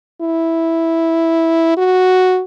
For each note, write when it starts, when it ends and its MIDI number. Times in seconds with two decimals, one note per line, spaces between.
0.21 1.76 64
1.77 2.42 66